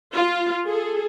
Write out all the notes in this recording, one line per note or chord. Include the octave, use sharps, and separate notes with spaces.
F4
G#4 A4